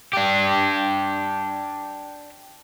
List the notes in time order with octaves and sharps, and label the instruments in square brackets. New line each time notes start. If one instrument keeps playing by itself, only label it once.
[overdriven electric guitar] D4 G4